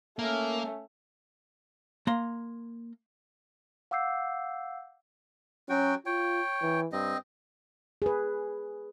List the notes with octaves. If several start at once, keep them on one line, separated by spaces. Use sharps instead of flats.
A3 A#3 C#4
A#3 A#5 C6
F5 F#5 D6 E6 G6 C7
F#3 C#4 F#4 G5
F4 C#5 G5
E3
G2 C4 D#5
G#4 B4